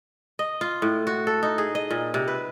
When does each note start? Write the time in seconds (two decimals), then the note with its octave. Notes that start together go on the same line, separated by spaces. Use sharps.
0.39 D#5
0.61 F4
0.82 A2
1.07 F#4
1.27 A4
1.43 D#4
1.58 G#4
1.75 D#5
1.90 A#2
2.14 C3
2.28 B4